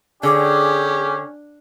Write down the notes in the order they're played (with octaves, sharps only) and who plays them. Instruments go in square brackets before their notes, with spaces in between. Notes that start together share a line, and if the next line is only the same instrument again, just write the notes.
[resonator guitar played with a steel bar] D3 [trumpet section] C#4 G4 [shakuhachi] G#4